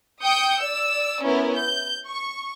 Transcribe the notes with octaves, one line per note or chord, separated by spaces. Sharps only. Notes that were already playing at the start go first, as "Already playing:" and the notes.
G5 D#6 G6 C#7
D5 E6
B3 C#4 E4 A#4
G6
C#6